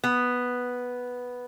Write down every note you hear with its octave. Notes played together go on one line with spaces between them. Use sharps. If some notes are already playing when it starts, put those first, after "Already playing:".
B3